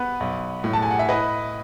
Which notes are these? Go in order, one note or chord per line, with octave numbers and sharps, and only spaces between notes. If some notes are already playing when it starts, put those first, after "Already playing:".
Already playing: B3 B4
B1
A2
A5
G#5
F#5
E5
E4 B4 D#5